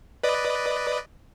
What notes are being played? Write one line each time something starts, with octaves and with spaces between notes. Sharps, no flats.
B4 D5 D#5